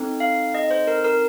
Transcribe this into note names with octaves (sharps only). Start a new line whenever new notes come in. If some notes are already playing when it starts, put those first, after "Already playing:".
Already playing: C4 D#4 A4
F5
D#5
C5
A#4
A#4